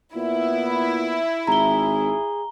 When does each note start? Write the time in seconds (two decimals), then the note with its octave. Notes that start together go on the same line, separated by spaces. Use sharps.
0.16 A#2 B3 E4
1.47 G#1 G#4 A#5 G7